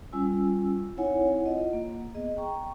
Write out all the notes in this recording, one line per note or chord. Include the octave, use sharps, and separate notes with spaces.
G3 C#4 F4 G#5 E6
C4 D#4 E4 C#5 F#5 G#5
F4 D#5 F#5
A#3
B3 G#4 D#5
G5 A#5 C#6